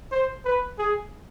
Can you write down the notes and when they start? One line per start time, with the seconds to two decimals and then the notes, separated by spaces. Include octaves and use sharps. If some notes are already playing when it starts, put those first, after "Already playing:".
0.12 C5
0.45 B4
0.79 G#4